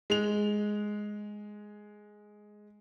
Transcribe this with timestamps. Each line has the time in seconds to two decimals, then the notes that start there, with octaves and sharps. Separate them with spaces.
0.10 G#3 F7